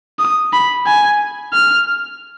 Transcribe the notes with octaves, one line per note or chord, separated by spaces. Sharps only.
D#6
B5
G#5
F6